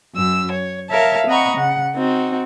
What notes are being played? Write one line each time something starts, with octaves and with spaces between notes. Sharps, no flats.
F#2 E6
C#5
A#4 C#5 E5 F5 A5
C4 D#5 F#5 A#5 B5 C#6
C#3 F#5
C4 D#4 F#4